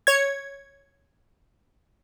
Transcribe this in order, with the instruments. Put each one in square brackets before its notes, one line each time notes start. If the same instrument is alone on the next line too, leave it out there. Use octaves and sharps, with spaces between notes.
[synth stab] C#5 G#6